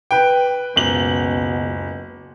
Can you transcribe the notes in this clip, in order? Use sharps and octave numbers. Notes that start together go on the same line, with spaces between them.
B4 G5
F#1 C#2 B2 F#7